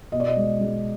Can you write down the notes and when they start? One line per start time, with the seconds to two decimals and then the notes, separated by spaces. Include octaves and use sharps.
0.12 B2 D#5
0.20 D5
0.28 D#5
0.36 G#3
0.60 G#3